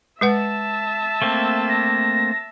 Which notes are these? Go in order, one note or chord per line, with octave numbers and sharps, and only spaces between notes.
G#3 B4 E5 F#5 A5
A3 A#3 C4
A#6